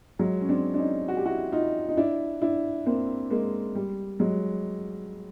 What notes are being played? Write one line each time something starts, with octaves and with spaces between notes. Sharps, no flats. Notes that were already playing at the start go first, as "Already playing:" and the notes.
F#3 G#3
C#4
C4 D4
D4
C#4 D#4
F#4
G4
E4 F#4
D#4 F4
D#4
D4 E4
D4 E4
A#3 C4
G#3 A#3
G3
F#3 G#3